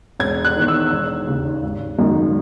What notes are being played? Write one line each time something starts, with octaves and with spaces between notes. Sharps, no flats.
E1 G#6
F#6
E2 D#3
E6
E1
D#2 C#3
G#1
F#2 D#3 G#3